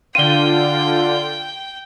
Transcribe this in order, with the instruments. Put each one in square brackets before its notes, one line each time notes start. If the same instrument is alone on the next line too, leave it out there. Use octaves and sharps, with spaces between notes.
[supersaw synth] D3 F4 [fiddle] G5 [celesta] D#7 G7